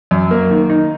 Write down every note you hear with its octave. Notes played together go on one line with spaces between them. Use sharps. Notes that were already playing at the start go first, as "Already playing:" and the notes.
F#2
A#3
D#3
D#4